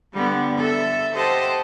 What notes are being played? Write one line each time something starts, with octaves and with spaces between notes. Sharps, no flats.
D3 G3 B3
A4 E5
G4 C5 D#5 F#5 A5